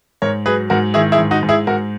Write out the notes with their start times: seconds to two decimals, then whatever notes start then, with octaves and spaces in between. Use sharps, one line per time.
0.22 G#2 A#4 C#5
0.46 F#3 G#4 B4
0.70 G#2 F#4 A#4
0.94 D#3 E4 G#4
1.12 E4 G#4
1.18 G#2
1.31 D#4 F#4
1.43 G#2
1.49 E4 G#4
1.67 G#2 F#4 A#4